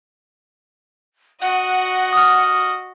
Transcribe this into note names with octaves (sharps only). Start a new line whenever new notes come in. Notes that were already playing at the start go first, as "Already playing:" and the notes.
F#4 D#5 F#5
D#6 F6